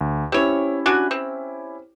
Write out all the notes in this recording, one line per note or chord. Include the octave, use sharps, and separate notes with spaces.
D2
C4 C#4 E4 G4 C#5
D4 F#4 G#5
C4